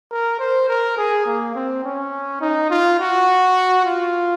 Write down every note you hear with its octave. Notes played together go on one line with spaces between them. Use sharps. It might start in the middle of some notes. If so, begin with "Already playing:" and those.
A#4
C5
A#4
G#4
A#3
C4
C#4
D#4
F4
F#4
F4